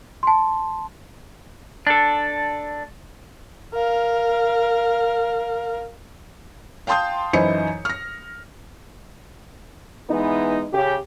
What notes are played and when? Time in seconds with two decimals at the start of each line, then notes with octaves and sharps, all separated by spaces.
0.23 A5 C6
1.87 D4 A4
3.74 A#4 F5
6.87 F5 G5 A5 C6 D#6 G6
7.33 F#2 E3 D#4 E4 C5 C#7
7.85 F6 A#6
10.10 E3 G#3 B3 D#4
10.73 C#3 G4